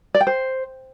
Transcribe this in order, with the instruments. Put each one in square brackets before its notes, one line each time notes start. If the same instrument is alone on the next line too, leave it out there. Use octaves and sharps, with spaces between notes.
[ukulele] D5
G5
C5